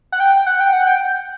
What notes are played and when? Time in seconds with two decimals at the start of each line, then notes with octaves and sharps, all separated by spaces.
0.12 F#5
0.20 G5
0.47 F#5
0.60 G5
0.73 F#5
0.87 G5